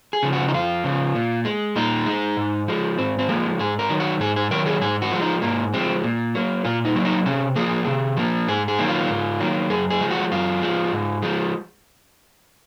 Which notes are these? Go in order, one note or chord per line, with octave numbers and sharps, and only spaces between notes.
G#4
C#3 F3
F#4
D#4
F2 F4
C#3 F3
A#2
G#3
A#2 D#4
G#3
G#2
F3 G#3
G#2 C4
C4
F3 G#3 A#3
G#2 G#4
A#4
D#3 F#3
F#4
G#2 G#4
G#4
D#3 F#3 A#4
G#4
G#2 G#4
F#4
F3 G#3
D#4
G#2 A#3
F3 G#3 C4
A#2
F#3 A#3
A#2 F4
D#4
F#3 A#3
D#4
C3 C#4
F3 A#3 G#4
C3
F3 A#3
G#2 G#4
G#4
D#3 F#3 A#3
F4
G#2
D#3 F#3 A#3
F#2 G#4
G#4
F3 G#3
F#4
F#2 F4
F3 G#3
G#2
F3 G#3